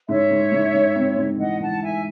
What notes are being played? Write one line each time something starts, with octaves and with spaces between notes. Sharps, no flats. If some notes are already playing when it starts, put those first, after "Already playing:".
G#2 C#5 E5
G#2
G#2
G#2
C4
G#2
E3 D#5 F#5
E3 F#5 A5
E4 E5 G#5